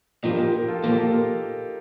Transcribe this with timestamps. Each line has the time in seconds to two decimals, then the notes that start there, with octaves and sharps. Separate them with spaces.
0.23 A#2 F3 A#3 D#4 G4
0.38 G4 A#4
0.53 G4 A#4
0.68 F4 A4
0.84 A#2 F3 A#3 G4 A#4
0.98 F4 A4
1.13 A#4